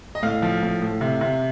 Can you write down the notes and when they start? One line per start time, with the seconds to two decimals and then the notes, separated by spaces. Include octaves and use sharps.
0.15 D#5
0.23 A2 F5
0.42 F3
0.62 A2
0.82 A2
1.01 C3
1.21 C3